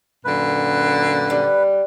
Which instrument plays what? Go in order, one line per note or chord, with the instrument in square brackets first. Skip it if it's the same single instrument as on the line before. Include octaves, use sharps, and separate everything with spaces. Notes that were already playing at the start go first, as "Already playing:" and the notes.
[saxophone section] F#2 A#2 D3 [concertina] B4
[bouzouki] G3